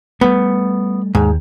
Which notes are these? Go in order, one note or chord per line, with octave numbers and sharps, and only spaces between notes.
G3 A3 B3
D#2 G#2